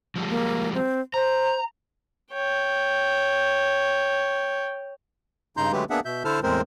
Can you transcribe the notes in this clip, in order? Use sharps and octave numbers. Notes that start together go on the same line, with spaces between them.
F3 G3 G#3
A#3
C4
C5 A#5
C#5 G5
G2 C#3 D#4 A#5 C6 G6
D3 F#3 G#3 A3 G4 B4
A#3 B3 D4 G#4 E5 F#5
B2 E5 G6
D3 E4 A4 C5 A5 F6
E2 A2 G#3 C4 A#4 C5